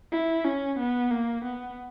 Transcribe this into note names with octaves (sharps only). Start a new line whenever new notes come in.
E4
C#4
B3
A#3
B3